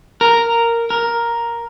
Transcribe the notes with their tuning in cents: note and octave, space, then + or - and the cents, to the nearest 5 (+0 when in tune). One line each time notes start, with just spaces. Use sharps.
A#4 -5
A#4 +5